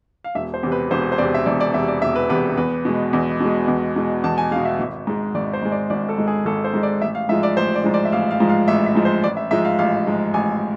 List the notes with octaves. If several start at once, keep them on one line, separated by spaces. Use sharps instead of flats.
F5
E1 E5
C5
E2 C3
B4
E1 C5
C5
E2 C3 D5
E5
E1 D5
D5
E2 C3 E5
D5
E1 E5
B4
E2 C3 B4
E2 B4
B2 G#3
E2
B2 G#3
E2
B2 G#3
E2 A5
G#5
B2 G#3 F5
E5
G#1
G#2 G#3
G#1 D5
C5
G#2 G#3
D5
G#1 D5
A4
G#2 G#3
G#4
G#1 A4
C5
G#2 G#3
D5
A1 E5
F5
G#2 F3 G#3 E5
D5
A1 C5
D5
G#2 F3 G#3
D5
E5
A1 F5
F5
G#2 F3 G#3
F5
A1 E5
E5
G#2 F3 G#3
C5
A1 D5
E5
G#2 F3 G#3 E5
F5
A1 F5
G#2 F3 G#3
A1 G#5